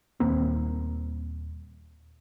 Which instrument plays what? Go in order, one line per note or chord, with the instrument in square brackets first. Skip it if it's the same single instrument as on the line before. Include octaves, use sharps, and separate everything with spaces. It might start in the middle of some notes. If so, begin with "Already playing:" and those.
[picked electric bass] D#1 D#2 A#3 C4